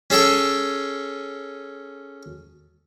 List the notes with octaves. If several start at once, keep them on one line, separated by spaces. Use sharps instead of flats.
C#4 G#4 A4 G5 C#6